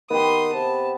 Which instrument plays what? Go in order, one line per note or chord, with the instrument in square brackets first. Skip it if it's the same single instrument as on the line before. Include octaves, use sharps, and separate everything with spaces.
[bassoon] D#3 [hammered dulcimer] B3 G4 [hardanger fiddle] C6 D#6
[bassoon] C3 [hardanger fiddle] A5